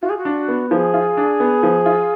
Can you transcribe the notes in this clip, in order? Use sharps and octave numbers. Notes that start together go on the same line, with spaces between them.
F4 F#4
G#4
F#4
D4
B3
F3 G#4
F4
D4
B3
F3
F4